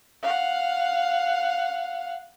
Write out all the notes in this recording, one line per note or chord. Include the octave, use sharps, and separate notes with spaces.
F5 F#5